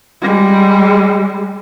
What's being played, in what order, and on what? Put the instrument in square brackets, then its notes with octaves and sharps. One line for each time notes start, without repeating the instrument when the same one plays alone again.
[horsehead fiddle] G3 G#3